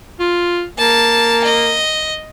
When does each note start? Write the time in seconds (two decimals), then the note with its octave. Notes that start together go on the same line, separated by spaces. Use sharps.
0.19 F4
0.78 A#3 A5
1.44 D#5